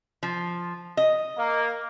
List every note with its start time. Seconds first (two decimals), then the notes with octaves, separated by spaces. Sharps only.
0.23 F3
0.97 D#5
1.38 A#3